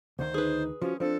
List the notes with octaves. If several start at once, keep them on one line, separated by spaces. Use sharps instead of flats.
D2 D#3 C5
D#4 G#4 B4
F3 C#4 F#4
F3 C4 D4 A4